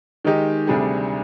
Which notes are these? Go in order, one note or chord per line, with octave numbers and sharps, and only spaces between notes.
D#3 G#3 D#4 G4
D2 C3 G3 D4 G#4